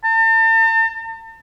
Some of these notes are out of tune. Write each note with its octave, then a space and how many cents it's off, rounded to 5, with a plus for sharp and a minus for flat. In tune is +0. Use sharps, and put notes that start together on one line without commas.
A5 +40